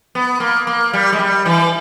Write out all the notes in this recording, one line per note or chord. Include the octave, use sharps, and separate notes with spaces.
B3
A#3
A#3
G3
G#3
G3
E3